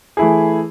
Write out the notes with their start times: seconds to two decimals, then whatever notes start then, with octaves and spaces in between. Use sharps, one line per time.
0.17 E3 A3 E4 G#4